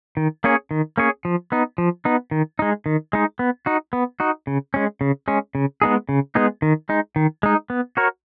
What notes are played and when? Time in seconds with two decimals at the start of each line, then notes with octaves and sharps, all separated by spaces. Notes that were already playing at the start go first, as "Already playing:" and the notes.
0.17 D#3
0.44 A#3 C#4 G#4 C#5
0.71 D#3
0.97 A#3 C#4 G#4 C#5
1.25 F3
1.52 B3 D#4
1.78 F3
2.05 B3 D#4
2.31 D#3
2.59 G#3 D#4
2.86 D#3
3.13 G#3 D#4
3.39 B3
3.66 D#4 F#4
3.93 B3
4.20 D#4 F#4
4.47 C#3
4.74 G#3 C#4
5.01 C#3
5.28 G#3 C#4
5.55 C#3
5.82 G#3 B3 D#4 G#4
6.09 C#3
6.35 G#3 B3 D#4 G#4
6.62 D#3
6.89 G#3 D#4
7.16 D#3
7.43 G#3 D#4
7.70 B3
7.97 F#4 A#4 C#5